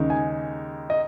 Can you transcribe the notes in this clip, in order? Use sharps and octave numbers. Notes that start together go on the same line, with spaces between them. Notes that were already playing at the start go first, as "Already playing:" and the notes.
Already playing: D#2 C#3 G#3 D#4
G#5
D#5